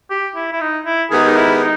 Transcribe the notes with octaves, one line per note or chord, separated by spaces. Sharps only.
G4
E4
E4
D#4
E4
D#3 G#3 B3 G4 G#4 A#4
D#4
E4
D#4